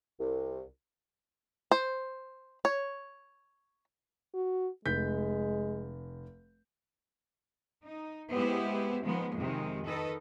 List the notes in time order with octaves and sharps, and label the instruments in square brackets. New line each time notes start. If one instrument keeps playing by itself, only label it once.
[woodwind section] C2
[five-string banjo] C5
C#5
[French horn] F#4
[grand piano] F1 G6 B6 [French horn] G#3
[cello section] D#4
G#3 B3 E4 G4 C5
D#3 F3 G#3 B3
F2 C3 D#3 G#3
D#3 A4 B4 D#5